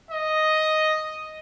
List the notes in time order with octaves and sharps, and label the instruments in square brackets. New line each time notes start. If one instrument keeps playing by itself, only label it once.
[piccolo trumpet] D#5